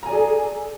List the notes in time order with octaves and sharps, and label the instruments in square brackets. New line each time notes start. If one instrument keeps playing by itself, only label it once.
[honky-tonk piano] A#5
G#5
D5
G#4
A4